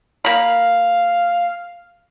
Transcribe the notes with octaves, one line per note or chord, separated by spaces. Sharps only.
A#3 F5 B5